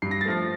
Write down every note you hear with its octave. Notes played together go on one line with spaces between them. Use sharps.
G2 C7
A#6
A6
F3 A3 A#6